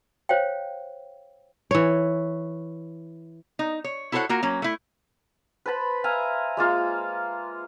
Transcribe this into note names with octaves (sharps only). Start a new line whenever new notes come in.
C5 C#5 F5 G5
E3 C#5
D#4
C#5
E4 F#4 A4 C5 C#5 F#5
A#3 F4 F#4 A#4
F#3 A#3 C#4
A3 E4
B4 C5 A5 B5
E5 F5 G#5 A#5
G#3 A#3 F4